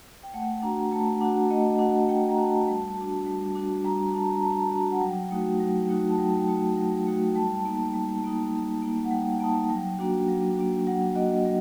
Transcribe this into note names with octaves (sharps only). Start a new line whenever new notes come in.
G5
A3 F#5
D4 F#4 A#5
A3 A5
D4 F#4 F#5
A3 D#5
D4 F#4 F#5
A3 G5
A#5
D4 F#4 A5
G3
D4 F#4
G3
D4 F#4
G3 A#5
D4 F#4 A5
A#5
G3 A5
D4 F#4 A5
F#5
F#3 G5
A3 D#4 F#4
F#3
A3 D#4 F#4
A5
F#3 G5
A3 D#4 F#4
F#3
A3 D#4 F#4
G5
G3 A5
A#3 D#4
G3
A#3 D#4
G3
A#3 D#4
F#5
G3 G5
A#3 D#4 A5
F#3 G5
A#3 D4 F#4
F#3
A#3 D4 F#4
F#3 F#5
A#3 D4 F#4 D#5
F#3